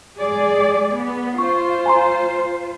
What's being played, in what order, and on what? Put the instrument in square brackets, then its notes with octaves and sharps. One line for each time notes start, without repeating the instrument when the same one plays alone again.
[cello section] G#3 G#4 D5
B3
[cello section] F4 C5 [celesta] C#6
[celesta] G#5 A#5 C6